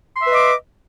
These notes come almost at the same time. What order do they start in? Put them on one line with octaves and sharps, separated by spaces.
C6 E5 B4 D#5 D6